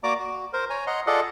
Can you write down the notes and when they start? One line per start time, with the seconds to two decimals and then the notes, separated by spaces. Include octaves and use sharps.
0.04 A#3 F#4 D5 A#5 D6
0.19 F#4
0.53 A#4 C5
0.70 C#5 G#5 A#5
0.87 D#5 F#5 A#5 C6
1.07 F4 G#4 A4 D5 D#5 F#5